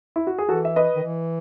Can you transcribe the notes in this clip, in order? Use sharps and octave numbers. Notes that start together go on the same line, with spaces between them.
E4
F#4
G#4
E3 F#4 A4
E5
B4 D#5
D#3
E3